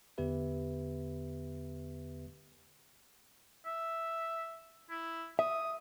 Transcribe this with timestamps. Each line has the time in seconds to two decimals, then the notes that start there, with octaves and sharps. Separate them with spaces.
0.18 E2 D3 B3 G4 B4 E5
3.66 E5
4.90 E4
5.39 E5 D#6